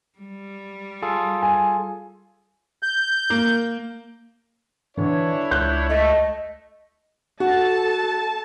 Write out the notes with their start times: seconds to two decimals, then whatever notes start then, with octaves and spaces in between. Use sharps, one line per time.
0.19 G3
1.02 F4 G#4 A4
1.43 G#5
2.83 G6
3.30 A#3
4.97 D3 E3 D4 E4 C#5
5.51 C#2 F#6 G6
5.89 A3 D#5
7.40 F#4 A4 A5